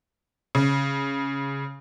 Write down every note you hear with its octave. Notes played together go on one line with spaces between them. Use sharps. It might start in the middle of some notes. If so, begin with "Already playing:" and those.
C#3